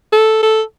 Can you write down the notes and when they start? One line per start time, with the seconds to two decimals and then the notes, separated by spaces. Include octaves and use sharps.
0.12 A4
0.43 A4